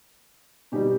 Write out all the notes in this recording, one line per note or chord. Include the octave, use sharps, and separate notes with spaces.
B2 G3 D#4 G4